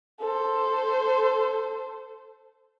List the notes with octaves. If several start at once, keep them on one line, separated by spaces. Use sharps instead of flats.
A4 C5